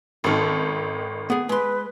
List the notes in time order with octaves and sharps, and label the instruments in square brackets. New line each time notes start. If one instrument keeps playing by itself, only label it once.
[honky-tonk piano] G#1 D#3 [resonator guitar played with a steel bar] C#4 A4
[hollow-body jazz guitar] B3 G#4
[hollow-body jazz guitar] G#3 C6 [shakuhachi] B4